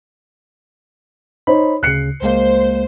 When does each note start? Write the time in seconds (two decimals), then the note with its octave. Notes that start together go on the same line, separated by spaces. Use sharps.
1.47 D#4 C5 C#5 B5
1.83 D2 C#3 F#6 C7 C#7
2.22 C#2 G#3 A#3 C5